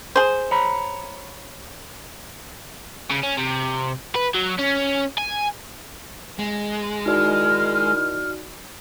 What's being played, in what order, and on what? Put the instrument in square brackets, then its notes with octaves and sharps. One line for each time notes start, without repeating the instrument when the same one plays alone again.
[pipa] G#4 C5
[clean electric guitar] C#5 A#5 B5
[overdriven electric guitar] C#3
C#4
C3
B4
F#3
C#4
G#5
[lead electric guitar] G#3
[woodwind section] D#3 E4 F6 [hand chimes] D#4 F#4 D5